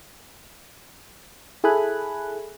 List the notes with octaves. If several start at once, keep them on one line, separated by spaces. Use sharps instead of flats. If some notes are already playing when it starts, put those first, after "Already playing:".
E4 G#4 A4 G#5 B5 F#6